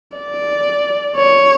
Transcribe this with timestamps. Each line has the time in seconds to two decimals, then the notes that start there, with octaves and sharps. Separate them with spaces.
0.17 D5
1.17 C#5